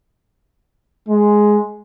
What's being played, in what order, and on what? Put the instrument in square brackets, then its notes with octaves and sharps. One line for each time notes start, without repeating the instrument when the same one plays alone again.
[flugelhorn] G#3